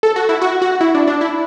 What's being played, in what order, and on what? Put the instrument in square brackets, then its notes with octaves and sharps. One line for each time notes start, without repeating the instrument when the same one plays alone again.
[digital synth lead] A4
F#4
E4
F#4
F#4
E4
D4
D4
E4